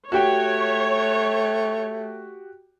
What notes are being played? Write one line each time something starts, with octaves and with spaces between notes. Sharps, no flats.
A3 F#4 G4 C#5 G5